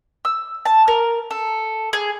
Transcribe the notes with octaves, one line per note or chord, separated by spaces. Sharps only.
E6
A5
A#4
A4
G#4